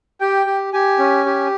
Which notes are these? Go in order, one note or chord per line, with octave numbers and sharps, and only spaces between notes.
G4 G5
G4
G4 G#5
C#4
G4